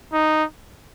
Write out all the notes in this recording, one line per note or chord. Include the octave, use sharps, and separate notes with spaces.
D#4